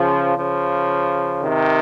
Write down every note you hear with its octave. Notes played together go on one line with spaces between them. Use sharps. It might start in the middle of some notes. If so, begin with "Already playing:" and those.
Already playing: C#3 F3
C#3 F3
C3 D#3